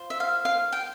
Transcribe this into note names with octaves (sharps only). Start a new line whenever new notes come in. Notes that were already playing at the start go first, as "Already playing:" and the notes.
Already playing: F4 C5
E5
F5
F5
G5